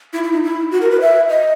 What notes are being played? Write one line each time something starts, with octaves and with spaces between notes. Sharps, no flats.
E4
E4
D#4
E4
F#4
A#4
B4
E5
D#5